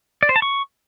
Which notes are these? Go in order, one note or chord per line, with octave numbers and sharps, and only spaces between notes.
D5
C5
A5
C#6